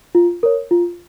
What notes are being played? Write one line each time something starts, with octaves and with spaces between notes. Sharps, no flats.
F4
A#4 C#5
F4